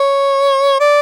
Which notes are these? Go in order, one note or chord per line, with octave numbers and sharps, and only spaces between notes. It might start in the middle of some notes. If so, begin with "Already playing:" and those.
Already playing: C#5
D5